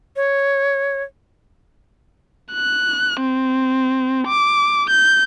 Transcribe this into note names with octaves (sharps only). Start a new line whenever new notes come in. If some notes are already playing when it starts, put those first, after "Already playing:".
C#5
F#6
C4
D6
G6